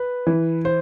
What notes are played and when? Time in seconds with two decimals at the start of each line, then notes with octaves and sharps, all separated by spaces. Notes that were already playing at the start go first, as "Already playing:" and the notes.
Already playing: B4
0.27 E3
0.65 C5